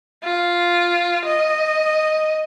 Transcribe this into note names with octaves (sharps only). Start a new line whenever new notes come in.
F4
D#5